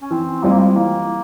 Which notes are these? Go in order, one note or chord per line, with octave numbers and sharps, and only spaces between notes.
C#4
E3 C4
G3 G#3 C4 F4
A#3
G#3
E3 A#3